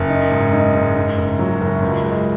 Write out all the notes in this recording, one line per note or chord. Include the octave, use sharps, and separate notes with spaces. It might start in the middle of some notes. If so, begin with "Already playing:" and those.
Already playing: F#1
D#4
G#2
D#4
G#2
D#4
F#1
F#3
F#1
C#2
G#3